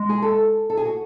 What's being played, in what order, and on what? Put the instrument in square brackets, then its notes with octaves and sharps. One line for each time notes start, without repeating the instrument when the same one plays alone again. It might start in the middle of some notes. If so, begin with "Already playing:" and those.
Already playing: [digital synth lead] G#3
[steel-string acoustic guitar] G#4
A4
A4
G#4
F#4